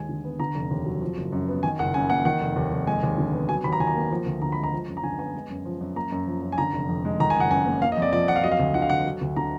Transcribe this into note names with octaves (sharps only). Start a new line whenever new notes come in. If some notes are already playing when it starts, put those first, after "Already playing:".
Already playing: D#2 G#3 G#5
D3
B3
D3 A#5
F1
D#2
F#3
F3
F#1
F#2
B3
D#3 G#5
F#1 F#5
F#2 G#5
A#3 F#5
D#3 F#5
F1
D#2
F1
G#3 G#5
D#2
D3
B3
F#3 G#5
D#2 B5
A#5
D#3 G#5
A#5
A#3
F3
D2
D3 A#5
G#3 B5
A#5
F3
F#2
A#5
D3 G#5
B3 G#5
G#3
F#2
F3
F#2
A#3 A#5
F#2
F3
F#2
G#5
D3 A#5
F1
F2
G#3
D#3 A#5
G#5
F#1 F#5
F#2 G#5
A#3
A#3 F5
D#5
F2
D5
F3 D5
F2 F#5
F5
F#3 D#5
F5
D2
D3 F#5
F5
D2 F#5
F#3
D2
D3 A#5